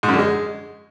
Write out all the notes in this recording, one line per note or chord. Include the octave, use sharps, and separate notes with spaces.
G#2
F#2
D3
G#3